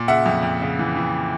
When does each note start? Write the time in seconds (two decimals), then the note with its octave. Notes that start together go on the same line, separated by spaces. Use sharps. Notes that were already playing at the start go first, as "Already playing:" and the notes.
Already playing: A#2
0.08 C#3 E5 F#5
0.26 F2
0.43 F2
0.62 C#3
0.79 E3
0.96 E3